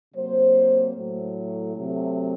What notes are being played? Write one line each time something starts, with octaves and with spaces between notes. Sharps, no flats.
C3 F#3 A#3 C5
A2 F#3 A3
C3 F#3 A3